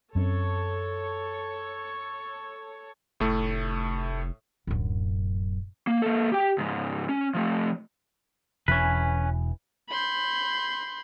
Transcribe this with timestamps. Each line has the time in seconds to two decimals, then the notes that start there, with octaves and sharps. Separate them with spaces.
0.15 F#2 C4 C#4 A4 C#5
3.20 F1 A2 A3
4.67 D1 F#2
5.87 A#3
6.02 A#3 A4
6.32 G4 G5
6.58 C#2 G#2
7.09 C#4
7.34 F3 A3
8.68 E1 E3 C#4 B4
9.89 B5 C6 G6